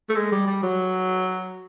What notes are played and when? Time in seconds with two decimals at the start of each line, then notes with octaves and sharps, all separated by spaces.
0.09 A3
0.16 G#3
0.32 G3
0.47 G3
0.63 F#3